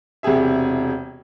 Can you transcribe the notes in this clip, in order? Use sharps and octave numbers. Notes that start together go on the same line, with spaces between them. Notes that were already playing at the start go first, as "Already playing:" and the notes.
E1 C3 G4 G#4 E5